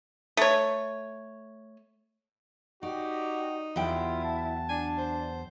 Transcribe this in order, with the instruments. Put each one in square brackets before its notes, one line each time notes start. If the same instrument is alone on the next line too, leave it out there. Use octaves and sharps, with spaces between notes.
[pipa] A3 C#5
[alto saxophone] D#4 [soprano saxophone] F#4 [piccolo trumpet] G4 [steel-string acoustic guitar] D5
[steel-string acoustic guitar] E2 F#3 G5 [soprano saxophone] E4 [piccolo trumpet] F4
[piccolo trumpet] A5
[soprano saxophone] D4 [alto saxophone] G#5
[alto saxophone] C5